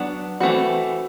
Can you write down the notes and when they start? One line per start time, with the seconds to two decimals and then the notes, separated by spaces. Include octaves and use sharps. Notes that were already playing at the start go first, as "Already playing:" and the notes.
Already playing: F#3 B3 D4
0.40 E3 A3 C4 F#4